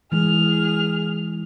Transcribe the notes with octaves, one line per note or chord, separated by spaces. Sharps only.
E3 G#3 G#4 F6